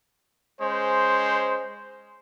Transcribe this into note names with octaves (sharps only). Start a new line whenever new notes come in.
G#3 C#4 C5